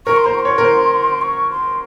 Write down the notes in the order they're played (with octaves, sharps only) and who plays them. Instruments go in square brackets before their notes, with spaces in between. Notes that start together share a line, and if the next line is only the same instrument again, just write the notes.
[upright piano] A#4 [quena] C#6
[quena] C6
[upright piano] C5 [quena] A#5
[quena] C#6
C6
[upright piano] C#5
A#4
C5
[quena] C#6
C6